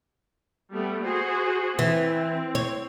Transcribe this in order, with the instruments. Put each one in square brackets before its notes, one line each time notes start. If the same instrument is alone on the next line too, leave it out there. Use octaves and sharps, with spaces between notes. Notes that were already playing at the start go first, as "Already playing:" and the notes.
[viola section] G3 A3 B3
F#4 G#4 C5
[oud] E3 [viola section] C4
[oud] C#5